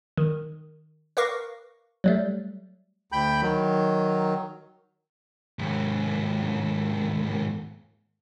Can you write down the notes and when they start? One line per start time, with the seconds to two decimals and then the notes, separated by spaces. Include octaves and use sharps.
0.17 D#3
1.17 A#4 B4 F5 C#6 D6 A#6
2.04 F#3 G3 A3
3.12 D2 G5 B5 G6
3.42 D#3 F#3
5.59 D#2 G#2